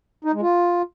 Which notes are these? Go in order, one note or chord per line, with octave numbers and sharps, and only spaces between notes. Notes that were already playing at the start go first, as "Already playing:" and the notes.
D#4
G#3
F4